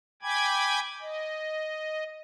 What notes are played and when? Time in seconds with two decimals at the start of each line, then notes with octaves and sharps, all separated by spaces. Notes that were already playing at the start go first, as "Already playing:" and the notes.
0.23 G5 G#5 B5 D6 G#6
1.01 D#5